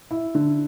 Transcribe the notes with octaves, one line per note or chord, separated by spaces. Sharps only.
E4
D3